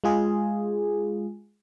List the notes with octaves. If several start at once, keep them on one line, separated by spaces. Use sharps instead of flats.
G#3 F4 G#4